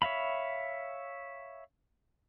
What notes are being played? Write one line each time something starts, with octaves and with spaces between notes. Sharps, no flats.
C#5 E5 F5 B5